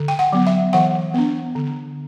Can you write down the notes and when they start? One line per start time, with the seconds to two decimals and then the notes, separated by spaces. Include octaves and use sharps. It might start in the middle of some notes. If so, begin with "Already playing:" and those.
Already playing: D3
0.08 G5
0.19 F#5
0.33 F#3 B3
0.47 E5
0.73 E3 F#5
1.14 B3 D4
1.55 D3